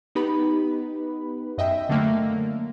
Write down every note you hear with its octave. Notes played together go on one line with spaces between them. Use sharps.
B3 D#4 G4 B4 B5
F#2 D#5 E5 G5
D3 F#3 A3 A#3